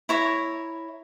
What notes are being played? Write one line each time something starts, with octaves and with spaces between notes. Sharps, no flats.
E4 C#5 A#5